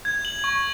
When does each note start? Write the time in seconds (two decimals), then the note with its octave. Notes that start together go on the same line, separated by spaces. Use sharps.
0.05 G#6
0.25 F#7
0.44 C#6